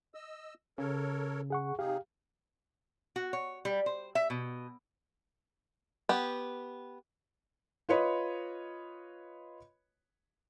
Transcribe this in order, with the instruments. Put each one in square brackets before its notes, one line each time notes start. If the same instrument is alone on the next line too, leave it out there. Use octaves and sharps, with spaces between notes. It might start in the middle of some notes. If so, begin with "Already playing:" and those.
[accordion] D#5 E6
[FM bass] C#3 [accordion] A4 A#4 C#5
[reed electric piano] G#4 F#5 C#6
[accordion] C3 D#4 G#4 [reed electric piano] G4 F5
[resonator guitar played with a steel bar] F#4
C#5
G3
C5
E5
B2
[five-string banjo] B3 G4
[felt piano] F4 B4 C#5 D#5 B5